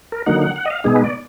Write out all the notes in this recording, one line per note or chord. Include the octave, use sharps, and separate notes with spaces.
A#4
D3 F#3 A#3 D#4 F#5
F#5
F#5
D#5
F5
B2 G#3 B3 D#4 G#4
B4
D5